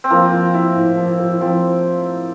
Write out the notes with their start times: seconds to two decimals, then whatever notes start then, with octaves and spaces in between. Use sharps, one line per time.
0.04 C4
0.10 F3 A#3
0.32 F3
0.54 E4
0.76 A2
0.97 F3
1.20 F3
1.40 F3 C4